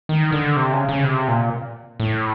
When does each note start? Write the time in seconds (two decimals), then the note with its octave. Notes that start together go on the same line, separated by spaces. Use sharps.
0.09 D#3
0.32 D3
0.57 C3
0.73 C#3
0.89 C#3
1.04 C3
1.28 A#2
2.00 A2